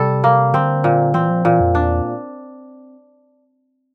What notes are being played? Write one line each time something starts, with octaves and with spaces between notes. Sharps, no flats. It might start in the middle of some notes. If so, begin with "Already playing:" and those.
Already playing: C3 G3 A4
A#3
D3 C4
A#2
E3 C4
F3
A#2 E3
F2
E2 D4